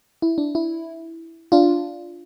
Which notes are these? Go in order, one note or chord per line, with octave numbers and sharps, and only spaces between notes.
E4
D4
E4
D4 F4